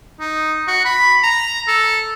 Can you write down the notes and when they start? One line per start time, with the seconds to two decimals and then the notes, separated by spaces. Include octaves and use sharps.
0.20 D#4
0.68 F#4
0.85 B5
1.23 A#5
1.68 A4